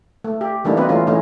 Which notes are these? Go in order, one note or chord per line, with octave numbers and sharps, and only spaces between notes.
A3
G4
E3 G3 A3 A#3 D4 D#4
B3 C4 D#4 F#4 B4
E3 A3 C#4 F4
E3 A3 C#4 D#4